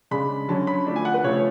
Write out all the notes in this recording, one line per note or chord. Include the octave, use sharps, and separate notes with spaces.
C#3 G#3 D4 B5
D3 F#3 C#4 A5
B5
F3 A3 D4
G#5
F#5
B4
C#3 F3 A3 C#4 C#5